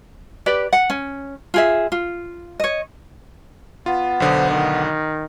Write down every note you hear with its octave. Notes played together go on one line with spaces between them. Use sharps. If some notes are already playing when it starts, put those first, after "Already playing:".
G4 B4 D5
F#5
C#4
F4 G#4 E5
F4
C#5 D#5
B3 F4
B1 D3 C5 D#6
D#3